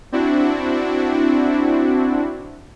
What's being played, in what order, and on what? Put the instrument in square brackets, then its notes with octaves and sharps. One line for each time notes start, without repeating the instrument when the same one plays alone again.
[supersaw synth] C4 D4 E4 F#4